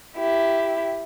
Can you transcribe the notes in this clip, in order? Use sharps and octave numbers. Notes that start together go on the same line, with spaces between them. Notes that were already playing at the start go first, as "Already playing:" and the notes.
E4 G4